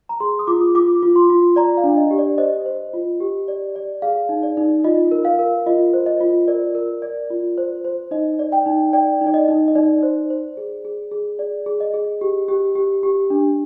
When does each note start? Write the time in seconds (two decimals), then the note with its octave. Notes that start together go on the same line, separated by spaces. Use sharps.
0.09 A#5
0.20 G#4 C6
0.39 D#6
0.47 F4 D6
0.75 F4 D6
1.03 F4
1.16 C6
1.30 F4
1.56 D5 A#5
1.77 F5
1.84 D4
1.97 D#5
2.11 G4
2.18 D5
2.38 C5 D#5
2.66 C5
2.94 F4
3.20 G4
3.48 D5
3.76 D5
4.02 G#4 F5
4.29 D#4
4.43 D5
4.57 D#4
4.84 F4 D#5
5.11 A#4
5.25 F5
5.39 A#4
5.66 F4 D#5
5.94 C5
6.06 D#5
6.20 F4
6.48 A#4 D5
6.75 A#4
7.02 D5
7.30 F4
7.58 C5
7.84 C5
8.11 D#4 D#5
8.39 D5
8.52 G5
8.66 D#4
8.93 D5 G5
9.21 D#4
9.27 D5
9.34 D#5
9.48 D#4
9.68 D#5
9.75 D#4 D5
10.03 C5
10.30 C5
10.57 G#4
10.85 G#4
11.11 G#4
11.39 G#4 D5
11.66 G#4
11.80 D#5
11.94 G#4
12.21 G4
12.48 G4
12.75 G4
13.03 G4
13.30 D4